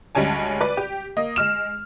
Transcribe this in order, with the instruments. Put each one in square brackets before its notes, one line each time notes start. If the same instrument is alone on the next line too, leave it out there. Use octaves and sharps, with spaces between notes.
[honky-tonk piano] D2 G3 G#3 C#4 G#5 A5
B4 D5
G4
A#3 D#5
G#3 F6 E7